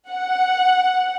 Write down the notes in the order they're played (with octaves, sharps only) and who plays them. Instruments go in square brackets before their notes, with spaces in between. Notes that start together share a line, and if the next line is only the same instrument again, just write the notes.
[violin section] F#5